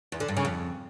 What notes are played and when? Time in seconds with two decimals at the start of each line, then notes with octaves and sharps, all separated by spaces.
0.12 E2
0.20 D3
0.28 G2
0.37 C#3
0.45 F2